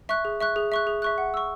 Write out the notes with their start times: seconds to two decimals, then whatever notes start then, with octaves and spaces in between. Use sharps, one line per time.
0.09 E5 C#6 F#6
0.25 G#4
0.41 E5 C#6 F#6
0.56 G#4
0.72 E5 C#6 F#6
0.87 G#4
1.02 E5 C#6 F#6
1.18 F#5
1.34 C#6 E6